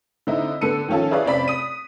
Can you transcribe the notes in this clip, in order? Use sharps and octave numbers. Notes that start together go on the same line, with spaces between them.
D3 C4 D#4 E4
D3 B3 A4 E6 C#7 D#7
D#3 F3 C#4 F4 A4
E4 G#4 B4 C#5 D5 F5
F1 C4 C#4 D5 B5 B6
D#6 D#7